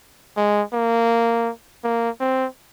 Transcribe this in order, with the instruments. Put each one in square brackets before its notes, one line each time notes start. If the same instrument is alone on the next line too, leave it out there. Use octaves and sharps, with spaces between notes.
[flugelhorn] G#3
A#3
A#3
C4